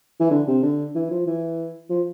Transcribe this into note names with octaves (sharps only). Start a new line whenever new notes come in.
E3
D3
C3
D3
E3
F3
E3
F3